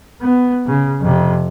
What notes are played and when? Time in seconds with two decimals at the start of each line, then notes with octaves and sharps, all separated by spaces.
0.22 B3
0.66 C#3
1.01 F2 C3